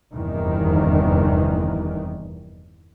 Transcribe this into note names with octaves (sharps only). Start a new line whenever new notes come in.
F1 E2 G2 D#3 E3